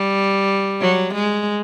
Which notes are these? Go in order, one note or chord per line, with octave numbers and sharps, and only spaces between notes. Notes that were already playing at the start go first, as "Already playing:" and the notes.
Already playing: G3
F#3
G#3